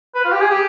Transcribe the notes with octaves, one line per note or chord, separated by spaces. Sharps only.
B4
F4
G4
G#4
G4